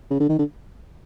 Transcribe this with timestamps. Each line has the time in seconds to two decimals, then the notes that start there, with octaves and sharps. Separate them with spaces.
0.11 C#3
0.20 D3
0.29 D#3
0.39 D3